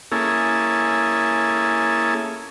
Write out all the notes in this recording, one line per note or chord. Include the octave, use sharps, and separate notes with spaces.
A#3 C#4 E4 G#4 A4